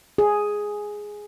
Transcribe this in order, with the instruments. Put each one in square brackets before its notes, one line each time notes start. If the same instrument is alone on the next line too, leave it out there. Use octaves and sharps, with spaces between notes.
[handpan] G#4